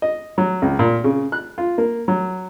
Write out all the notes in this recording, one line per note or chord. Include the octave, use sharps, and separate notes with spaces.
D#5
F#3
C#2
A#2
C#3
F#6
F4
A#3
F#3